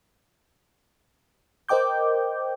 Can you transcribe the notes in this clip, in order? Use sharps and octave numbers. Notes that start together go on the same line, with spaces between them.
A#4 C5 D#5 G5 D6 G6